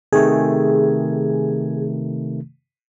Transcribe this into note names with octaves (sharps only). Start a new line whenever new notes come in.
C3 D#3 A3 G#4